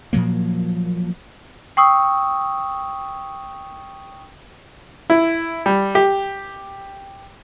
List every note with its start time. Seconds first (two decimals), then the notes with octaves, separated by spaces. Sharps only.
0.13 A#2 F3 F#3 A#3
1.77 G5 C#6 D#6 E6
5.10 E4
5.66 G3
5.95 G4